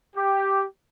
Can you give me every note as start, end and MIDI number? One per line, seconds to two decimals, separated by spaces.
0.16 0.65 67